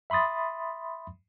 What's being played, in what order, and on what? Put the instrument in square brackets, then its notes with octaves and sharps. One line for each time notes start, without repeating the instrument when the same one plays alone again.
[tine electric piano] E5 B5 C6 D#6 A6